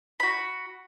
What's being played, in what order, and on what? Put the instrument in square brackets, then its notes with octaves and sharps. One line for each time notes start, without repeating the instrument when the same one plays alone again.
[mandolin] F#4 B5